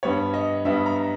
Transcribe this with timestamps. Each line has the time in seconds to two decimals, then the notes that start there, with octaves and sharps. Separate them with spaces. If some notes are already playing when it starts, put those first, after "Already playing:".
0.03 G2 G3 B3 C#5
0.34 D#5
0.65 G2 G3 B3 E5
0.86 A#5